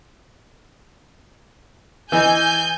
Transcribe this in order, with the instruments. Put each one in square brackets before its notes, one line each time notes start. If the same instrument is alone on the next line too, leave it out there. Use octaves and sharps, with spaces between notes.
[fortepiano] E3 D#5 [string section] G#5 G6